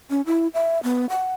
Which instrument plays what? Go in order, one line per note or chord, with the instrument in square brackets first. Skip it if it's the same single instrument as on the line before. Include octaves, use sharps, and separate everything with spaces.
[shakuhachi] C#4
E4
E5
B3
F#5